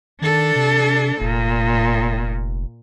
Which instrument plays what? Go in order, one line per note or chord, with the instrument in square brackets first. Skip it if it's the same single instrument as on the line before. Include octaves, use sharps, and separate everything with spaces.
[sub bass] D#3 [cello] D4 A4
[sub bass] C3
[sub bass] F1 [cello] A#2